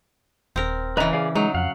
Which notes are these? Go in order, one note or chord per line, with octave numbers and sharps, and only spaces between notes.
D#1 C4 A#4
C#3 E3 B4 D#5 A#5
G#4 D5 F5
F#3 G#3 D#4
F2 F5 F#5